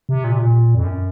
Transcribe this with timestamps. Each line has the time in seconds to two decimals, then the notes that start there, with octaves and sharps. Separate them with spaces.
0.09 C3
0.24 A#2
0.32 C3
0.39 A#2
0.75 F2
0.84 F#2